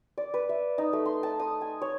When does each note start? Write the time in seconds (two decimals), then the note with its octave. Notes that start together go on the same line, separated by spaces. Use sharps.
0.18 D5
0.34 B4
0.49 E5
0.78 D#4
0.93 A3
1.05 C6
1.23 A5
1.40 D#6
1.61 G#5
1.81 C#5